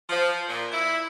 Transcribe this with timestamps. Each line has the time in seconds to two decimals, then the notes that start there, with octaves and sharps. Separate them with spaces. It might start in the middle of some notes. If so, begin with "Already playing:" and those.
0.09 F3
0.49 A#2
0.72 E4